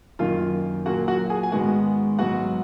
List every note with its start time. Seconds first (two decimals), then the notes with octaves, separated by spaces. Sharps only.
0.19 F#2 D#3 A#3 F4 F5
0.85 A#2 F#3 A#3 F#4 F#5
1.08 F#4 F#5
1.30 G#4 G#5
1.43 G#5
1.52 G#2 D#3 G#3 B3 F#4 F#5
2.19 G#2 F#3 B3 F#4 F#5